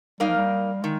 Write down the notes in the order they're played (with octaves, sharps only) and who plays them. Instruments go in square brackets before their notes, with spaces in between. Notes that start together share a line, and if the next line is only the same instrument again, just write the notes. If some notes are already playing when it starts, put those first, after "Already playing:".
[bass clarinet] G3 [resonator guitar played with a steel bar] A#3 D#4 A#4 F5
[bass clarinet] F3
G3
[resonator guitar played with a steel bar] D#3 [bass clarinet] G#3